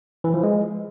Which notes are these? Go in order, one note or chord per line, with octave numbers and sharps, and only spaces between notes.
E3
F3
G#3